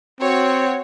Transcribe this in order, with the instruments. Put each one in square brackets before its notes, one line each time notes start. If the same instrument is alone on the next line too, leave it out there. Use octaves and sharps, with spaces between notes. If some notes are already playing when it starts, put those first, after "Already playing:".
[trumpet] C4 [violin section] F#4 C#5